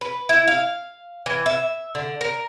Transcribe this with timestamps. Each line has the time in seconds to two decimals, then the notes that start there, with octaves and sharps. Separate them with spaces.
0.01 B4
0.29 E4
0.47 F5
1.26 E3
1.46 E5
1.95 D3
2.21 A#4